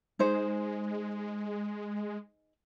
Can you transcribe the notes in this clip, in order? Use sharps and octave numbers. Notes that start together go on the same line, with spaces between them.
G#3 D#4 G#4 C5